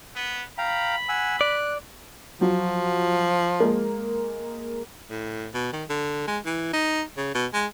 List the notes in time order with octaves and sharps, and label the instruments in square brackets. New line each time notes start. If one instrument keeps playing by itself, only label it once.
[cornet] B3
[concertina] F5 G5 A#5 [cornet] B5
[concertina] F#5 G#5 E6
[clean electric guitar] D5 [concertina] F#6
[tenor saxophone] F3 [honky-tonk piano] F#3 F4
[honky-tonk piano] G#3 A#3
[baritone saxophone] A2
B2
D#3
D3
G#3
E3
D#4
C#3
B2
G#3